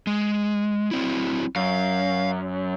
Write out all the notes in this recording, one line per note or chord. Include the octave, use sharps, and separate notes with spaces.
G#3
F#3 C4 E4
F#2 F5